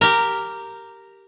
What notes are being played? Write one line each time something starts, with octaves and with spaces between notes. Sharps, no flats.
G4 A#4